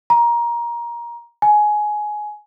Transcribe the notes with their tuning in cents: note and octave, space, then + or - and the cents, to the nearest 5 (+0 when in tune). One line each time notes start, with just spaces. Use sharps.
A#5 +20
G#5 +15